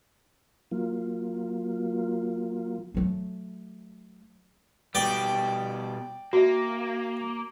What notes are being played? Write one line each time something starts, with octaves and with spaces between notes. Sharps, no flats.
F#3 A#3 F4
F#3 A3
B2 G3 D5 G5
A#3 F#4 E5